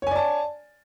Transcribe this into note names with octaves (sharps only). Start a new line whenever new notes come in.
C#5 D5 G#5 A5